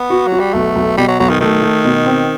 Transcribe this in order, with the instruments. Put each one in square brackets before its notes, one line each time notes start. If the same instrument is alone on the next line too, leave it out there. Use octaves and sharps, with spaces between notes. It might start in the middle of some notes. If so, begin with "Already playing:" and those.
Already playing: [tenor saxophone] B3
[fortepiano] F#4
[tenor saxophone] F#3
[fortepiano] F#4
[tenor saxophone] G3
[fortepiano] B1 [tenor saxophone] A3
[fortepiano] B1
[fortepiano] B2 [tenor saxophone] G3
[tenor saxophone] F#3
[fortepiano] B1 [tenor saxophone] F#3
[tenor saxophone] D#3
[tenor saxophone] D#3 [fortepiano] A3
[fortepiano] A3
B2
C4